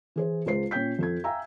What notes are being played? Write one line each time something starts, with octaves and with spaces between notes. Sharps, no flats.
E3 G#4 C5
C#2 G#3 C5 C7
A#2 C#4 G5 G6 B6
F2 A4 G#6
E5 F5 G5 G#5 A#5 E6